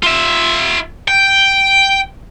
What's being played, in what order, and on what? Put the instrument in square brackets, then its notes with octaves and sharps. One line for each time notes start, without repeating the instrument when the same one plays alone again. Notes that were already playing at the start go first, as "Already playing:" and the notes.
[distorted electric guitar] F4 E5
G5